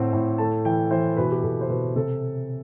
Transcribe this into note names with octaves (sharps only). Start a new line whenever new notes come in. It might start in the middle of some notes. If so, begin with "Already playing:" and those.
Already playing: A2 C4 F#5
A2
A3 A5
E3 G5
E3 C5
B2 B4
G4
B2 A4
C5
B2 B4
C3 A4